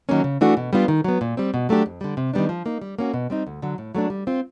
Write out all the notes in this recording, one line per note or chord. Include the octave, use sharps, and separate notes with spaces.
D#3 F#3 A#3 C#4
C#3
E3 A3 D4 F#4
B2
G3 B3 D4 F4
D#3
F#3 B3
A#2
G3 C4
B2
F#3 A3 D4 G4
F2
D3 G3
C3
D#3 G3 B3 D4
F3
A#3 D#4
G3
A#3 C#4 F#4
B2
G3 C4 D#4
D2
D3 F#3
A2
F#3 A3 D4
G3
C4 F4